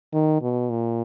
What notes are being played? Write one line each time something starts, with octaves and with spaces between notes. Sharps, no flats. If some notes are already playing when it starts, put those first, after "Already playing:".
D#3
B2
A#2